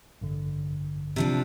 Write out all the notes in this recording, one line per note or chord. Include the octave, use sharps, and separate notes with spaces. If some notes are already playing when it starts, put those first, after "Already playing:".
A1 G2 D3
C3 F3 D4